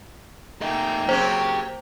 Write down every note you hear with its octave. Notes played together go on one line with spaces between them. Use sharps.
A3 A#3 D#4 G5
C#3 F#3 C4 G4 C5